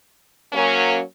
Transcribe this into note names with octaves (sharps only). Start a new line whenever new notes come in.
F#3 A#3 C#4